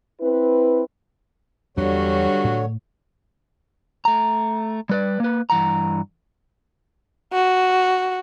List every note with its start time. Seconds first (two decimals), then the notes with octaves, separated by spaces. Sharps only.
0.21 C4 E4 B4
1.77 E2 G2 D3 F#3 G3 D4 F#4 C#5
2.44 A2
4.05 A3 A#5
4.89 G3 B4 D5
5.20 A#3 B4
5.50 G2 E3 F#5 A#5
7.33 F#4